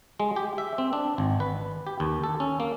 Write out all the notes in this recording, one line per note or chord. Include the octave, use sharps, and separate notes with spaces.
G#3
G4
E5
C4
D4
G#1
B4
G4
D#2
A4
C#4
A#3